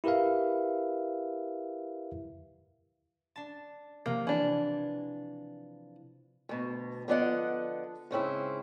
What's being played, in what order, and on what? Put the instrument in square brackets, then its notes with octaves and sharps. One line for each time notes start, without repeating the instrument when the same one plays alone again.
[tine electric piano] E4 G4 A#4 B4 E5 F5
[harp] D4 A5
[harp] C3 F3 [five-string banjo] A#3
[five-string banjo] E3 D4
[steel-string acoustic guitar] D2 B2
D3 F3 B3 D5 D#5 F#5
G#2 C#3 C4 E4